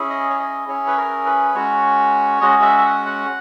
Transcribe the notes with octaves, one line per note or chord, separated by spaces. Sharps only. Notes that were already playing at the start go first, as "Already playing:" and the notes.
Already playing: C#4 E4 G#4
D#5
C#5
D#5
C#4 E4 G#4 C#5
B4
A#4
B4
G#3 C#4 F#4 C#5
G#3 C#4 F#4 D#5
E5
E5
F#5
F#5